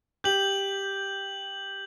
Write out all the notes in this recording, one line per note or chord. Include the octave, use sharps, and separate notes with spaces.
G4 G6 F#7